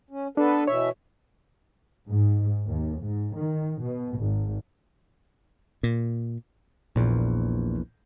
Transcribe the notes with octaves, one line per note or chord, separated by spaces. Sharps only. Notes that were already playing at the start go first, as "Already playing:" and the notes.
C#4
B3 D4 A4 B4
B2 E3 C#5 E5
G#2
D#2
G#2
D#3
B2
G#1
A#2
A#1 E2 A#2